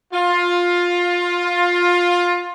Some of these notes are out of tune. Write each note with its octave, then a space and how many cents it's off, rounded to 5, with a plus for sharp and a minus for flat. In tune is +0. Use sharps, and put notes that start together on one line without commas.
F4 +15